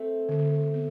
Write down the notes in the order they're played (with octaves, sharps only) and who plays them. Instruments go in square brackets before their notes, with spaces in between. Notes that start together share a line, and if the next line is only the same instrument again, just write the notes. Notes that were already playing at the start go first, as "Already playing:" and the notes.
Already playing: [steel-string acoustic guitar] A3 C4
[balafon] D3
B3